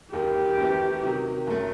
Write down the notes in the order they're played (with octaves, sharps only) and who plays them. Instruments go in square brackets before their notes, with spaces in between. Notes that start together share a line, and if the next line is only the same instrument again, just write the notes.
[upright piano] E1 D#2 D#3 [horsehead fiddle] G4
[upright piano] F#2 E3 A3
C3 D#3 F#3
F#1 F#2 F#3 A3